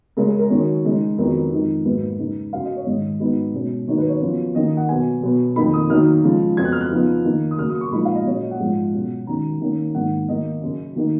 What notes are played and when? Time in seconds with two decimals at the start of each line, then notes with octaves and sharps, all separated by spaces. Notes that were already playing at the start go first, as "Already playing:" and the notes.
0.17 C#3 G#3 C#4 A#4
0.28 G#4
0.39 A#4
0.50 F#2 D#3 F#3 C#4
0.84 C#3 G#3 D#4
1.18 F2 D#3 F#3 B3 D#4 A#4
1.51 F2 D#3 G#3 D#4
1.85 G#2 F#3 A#3 B4
2.19 C#3 G#3 D#4
2.53 F#2 C#3 F#3 C#4 F5
2.64 D#5
2.76 C#5
2.86 G#2 D#3 G#3 D#4 D#5
3.20 G#2 F#3 B3 D#4
3.54 B2 G#3 C#4
3.88 D#3 F#3 A#3 D#4 C#5
3.98 B4
4.09 C#5
4.21 F#2 F3 B3 D#4
4.55 F#2 D#3 A#3 D#4 D#5
4.77 F#5
4.88 B2 F#3 B3 G#5
5.23 B2 F#3 B3
5.56 F2 D#3 A#3 D#4 B5
5.73 D#6
5.90 D#3 F#3 A#3 D#4 F6
6.24 C#3 F3 G#3
6.57 F2 C#3 F#3 B3 G#6
6.65 F#6
6.72 F6
6.80 F#6
6.91 C#3 F3 B3 D#4
7.25 D#3 A#3 D#4
7.51 D#6
7.58 F#2 C#3 F#3 A#3 F6
7.70 D#6
7.81 C#6
7.92 A#2 F3 G#3 D#4 B5
8.05 F5
8.15 D#5
8.26 A#2 F#3 C#4 C#5
8.34 D#5
8.51 F#5
8.60 G#2 F3 G#3
8.93 B2 F#3 C#4
9.27 F#2 D#3 G#3 C#4 A#5
9.61 D#3 A#3 C#4
9.95 G#2 D#3 A#3 F#5
10.28 D#3 A#3 D#4 D#5
10.62 F#2 C#3 F#3
10.96 D#3 A#3 D#4